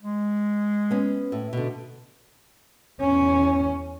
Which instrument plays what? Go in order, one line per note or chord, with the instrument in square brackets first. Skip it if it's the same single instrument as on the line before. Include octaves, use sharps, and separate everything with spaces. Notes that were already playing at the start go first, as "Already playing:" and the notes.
[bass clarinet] G#3
[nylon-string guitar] B3 C#4
A2
B2 D3
[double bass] E2 C#4